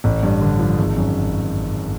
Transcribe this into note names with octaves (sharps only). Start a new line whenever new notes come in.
A1
G2
D3
F3
G#1
F#2